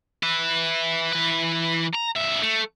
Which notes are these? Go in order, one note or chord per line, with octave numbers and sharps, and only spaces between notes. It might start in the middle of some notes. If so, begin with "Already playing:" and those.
B4 E5
E3 B4
A#5
G2 E5
A3